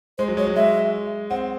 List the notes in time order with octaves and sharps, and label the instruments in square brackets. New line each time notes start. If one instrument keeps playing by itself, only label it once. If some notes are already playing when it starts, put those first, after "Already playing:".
[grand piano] G#3 [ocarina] C5
[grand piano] F#3
[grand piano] G#3 [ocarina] C#5
[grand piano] F#3
[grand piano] G#3 [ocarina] E5
[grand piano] C4 [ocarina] F#5